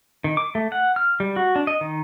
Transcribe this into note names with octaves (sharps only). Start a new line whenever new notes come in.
D#3
D6
A3
F#5
F6
G3
F#4
D4
D#5
D#3